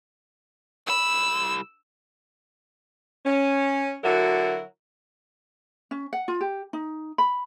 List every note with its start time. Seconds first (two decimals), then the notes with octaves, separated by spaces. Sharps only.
0.87 C2 B5 E6
3.26 C#4
4.04 D3 F#3 E4 F#4 A#4
5.91 C#4
6.13 F#5
6.28 F4
6.41 G4
6.73 D#4
7.18 B5